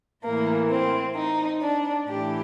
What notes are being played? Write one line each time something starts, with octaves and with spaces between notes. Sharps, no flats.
A2 E3 A#3
C4
D#4
D4
A2 E3 G4